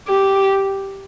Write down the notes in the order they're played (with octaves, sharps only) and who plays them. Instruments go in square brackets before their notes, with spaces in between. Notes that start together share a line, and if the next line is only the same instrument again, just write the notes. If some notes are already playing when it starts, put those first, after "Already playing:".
[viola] G4